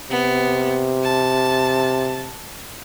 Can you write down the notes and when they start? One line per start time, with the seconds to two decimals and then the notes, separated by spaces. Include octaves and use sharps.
0.10 C3 B3
1.03 A5